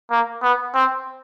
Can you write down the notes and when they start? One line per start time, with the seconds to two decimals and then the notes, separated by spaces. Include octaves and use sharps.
0.11 A#3
0.43 B3
0.75 C4